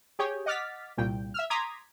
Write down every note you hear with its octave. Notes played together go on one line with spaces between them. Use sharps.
G4 G#4 C#5 G5
D#5 F#5 D6 F6 A6 B6
C2 A#2 G5
E5 E6 F6
A#5 C6 D6 D#6 G#6 B6